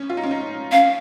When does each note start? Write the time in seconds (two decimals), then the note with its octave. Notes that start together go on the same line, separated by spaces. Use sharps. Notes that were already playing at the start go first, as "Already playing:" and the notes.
Already playing: C#4
0.10 F4
0.17 D#4
0.23 C#4
0.31 D#4
0.72 C#4 F5